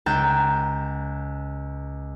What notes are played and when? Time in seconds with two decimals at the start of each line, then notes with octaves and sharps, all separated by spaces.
0.06 C#2 G5 A#5 F#6 A6 E7